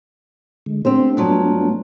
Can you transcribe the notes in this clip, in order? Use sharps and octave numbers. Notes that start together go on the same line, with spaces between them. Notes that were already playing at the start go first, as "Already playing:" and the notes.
D3 G#3
A3 B3 C4 D4 G4 C5
G2 F3 F#3